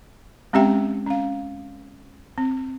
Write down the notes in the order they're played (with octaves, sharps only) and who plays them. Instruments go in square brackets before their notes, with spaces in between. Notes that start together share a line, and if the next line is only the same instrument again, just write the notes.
[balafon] G#3 C4 C#4 G4 E5 G5
C#4 F5
C4